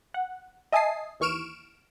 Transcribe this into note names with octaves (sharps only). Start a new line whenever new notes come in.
F#5
D#5 E5 G#5 A5 D#6 C7
D#2 E3 C#6 F6 D7 E7